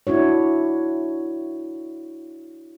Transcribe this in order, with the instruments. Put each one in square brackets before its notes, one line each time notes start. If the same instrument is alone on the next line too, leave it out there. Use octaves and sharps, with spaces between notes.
[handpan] D4 E4 F#4 C#5